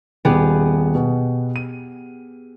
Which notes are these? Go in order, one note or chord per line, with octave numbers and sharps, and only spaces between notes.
D#1 B3 G4 G#4
B2
D#7